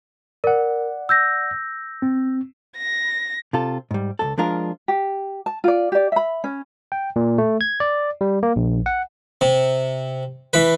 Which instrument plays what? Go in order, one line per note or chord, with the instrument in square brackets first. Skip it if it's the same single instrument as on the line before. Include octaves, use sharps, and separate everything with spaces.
[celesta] A#4 [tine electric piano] D5 F#5
[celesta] E6 G6 A#6
[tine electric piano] C4
[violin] A#6
[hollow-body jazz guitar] C3 F4 A4
G#2 G3
C#2 F#2 A4
F3 G#3 D4 F4 A#4
[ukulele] G4
A5
F4 D5
G4 D5
E5 B5
C#4
[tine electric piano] G5
A#2
A3
G#6
D5
G3
A#3
A#1
F#5
[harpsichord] C3
E3 B4